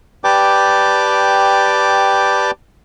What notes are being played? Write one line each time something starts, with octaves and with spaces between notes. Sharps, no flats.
G4 B4 D5 G5 A5 D6